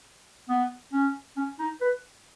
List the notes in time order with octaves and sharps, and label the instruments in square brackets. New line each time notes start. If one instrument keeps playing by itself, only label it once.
[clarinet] B3
C#4
C#4
D#4
B4